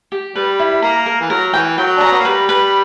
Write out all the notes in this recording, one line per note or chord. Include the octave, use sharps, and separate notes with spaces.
G4
G3 B4
E4
A#3 A#5
A#4
E3
F#3 A#4
E3 G5
F#3 G5
D4
C#4 A#5
B3
A#3
G3 B4
B4